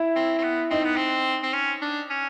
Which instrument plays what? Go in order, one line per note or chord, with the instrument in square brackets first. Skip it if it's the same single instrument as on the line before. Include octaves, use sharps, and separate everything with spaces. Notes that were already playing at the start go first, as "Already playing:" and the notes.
Already playing: [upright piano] E4
[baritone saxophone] C4
C4
B3
[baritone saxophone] C4 [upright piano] D#4
[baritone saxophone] B3
C4
C4
C#4
D4
C#4